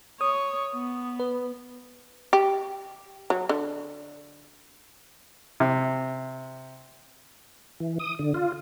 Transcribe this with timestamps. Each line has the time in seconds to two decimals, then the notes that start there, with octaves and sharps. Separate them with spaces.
0.21 C#5 D#6
0.73 B3
1.20 B4
2.33 G4
3.30 F#3
3.49 D3
5.60 C3
7.80 E3
7.99 D#6
8.19 D3
8.34 F4